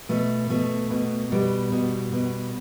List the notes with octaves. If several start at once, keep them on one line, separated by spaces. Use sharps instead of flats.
B2 A3
B2 A3
B2
B2 G3
B2
B2